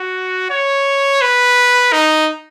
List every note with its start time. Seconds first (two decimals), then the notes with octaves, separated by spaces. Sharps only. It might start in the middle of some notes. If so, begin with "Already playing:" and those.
Already playing: F#4
0.50 C#5
1.22 B4
1.93 D#4